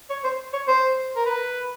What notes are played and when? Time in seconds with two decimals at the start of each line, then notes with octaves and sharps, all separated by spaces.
0.10 C#5
0.24 C5
0.53 C#5
0.68 C5
1.16 A#4
1.26 B4